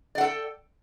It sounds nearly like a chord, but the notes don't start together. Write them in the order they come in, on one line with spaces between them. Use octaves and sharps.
D5 F#5 A4 G5